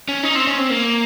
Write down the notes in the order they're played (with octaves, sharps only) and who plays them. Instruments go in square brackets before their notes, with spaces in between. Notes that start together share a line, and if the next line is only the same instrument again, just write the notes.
[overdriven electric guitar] C#4
D#4
C4
C#4
C4
A#3